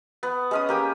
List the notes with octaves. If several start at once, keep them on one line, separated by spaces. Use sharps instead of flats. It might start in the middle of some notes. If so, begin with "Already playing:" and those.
B3
G#3 C#4 D#6
A#3 G4 G5